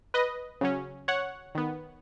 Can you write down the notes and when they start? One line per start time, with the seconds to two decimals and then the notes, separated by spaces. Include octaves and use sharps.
0.14 B4 D#5
0.61 C#3 F#3 C#4
1.08 C#5 F#5
1.55 D#3 B3